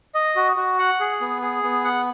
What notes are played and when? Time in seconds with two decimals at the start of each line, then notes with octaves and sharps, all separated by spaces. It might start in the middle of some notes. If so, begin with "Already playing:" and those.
0.15 D#5
0.36 F#4
0.57 F#4
0.79 F#5
1.00 G#4
1.21 B3
1.42 G#4
1.63 B3
1.85 F#5